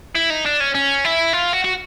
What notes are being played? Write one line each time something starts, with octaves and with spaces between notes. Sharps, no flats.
E4
D#4
D4
C#4
C#4
E4
F4
F#4
F#4